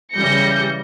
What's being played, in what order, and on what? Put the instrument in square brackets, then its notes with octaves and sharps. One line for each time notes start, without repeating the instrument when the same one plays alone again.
[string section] C#3 E3 G3 G6 A#6 C#7